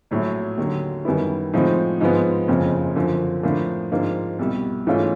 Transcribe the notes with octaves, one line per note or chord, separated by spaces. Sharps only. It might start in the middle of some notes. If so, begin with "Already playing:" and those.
A#1 A2 F#3
D#2 D3 F#3
F#2 D#3 G3 B3 E4
A2 F3 G#3 C4 D#4
G#2 F3 G#3 B3
F#1 F2 C#3 F3
F#2 D3 F3
A2 F3 A#3 D4
G#2 F3 A#3 D4
C2 B2 G3
G#2 E3 A3 C#4 F4